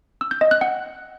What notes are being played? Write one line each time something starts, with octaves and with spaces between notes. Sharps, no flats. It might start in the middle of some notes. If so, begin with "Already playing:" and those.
E6
G6
D#5
F#6
F#5